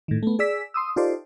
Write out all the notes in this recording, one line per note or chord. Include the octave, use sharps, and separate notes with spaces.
A2 D#3
A3 B3
G#4 D5 E6 B6
C6 D#6 E6
D#4 F4 G4 A4 C5 D5